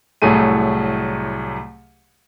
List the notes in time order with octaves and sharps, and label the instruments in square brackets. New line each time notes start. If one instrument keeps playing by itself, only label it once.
[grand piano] C2 A2 F#3 A3 G#4 D#7